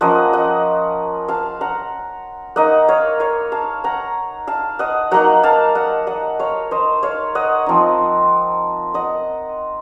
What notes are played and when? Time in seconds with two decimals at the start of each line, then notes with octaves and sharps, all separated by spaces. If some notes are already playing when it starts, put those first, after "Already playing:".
0.01 F3 A#3 C#4 D#5 F#5
0.33 D#5 F#5
1.28 F5 A5
1.61 F#5 A#5
2.56 A#3 D#4 D#5 F#5
2.89 C#5 F5
3.20 C#5 F5
3.52 F5 A5
3.84 F#5 A#5
4.47 F5 A5
4.79 D#5 F#5
5.11 F#3 A#3 D#4 F#5 A#5
5.43 F5 A5
5.75 D#5 F#5
6.07 D#5 F#5
6.39 C#5 F5
6.71 C5 D#5
7.03 C#5 F5
7.35 D#5 F#5
7.66 F3 C4 D#4
8.94 D#5 F#5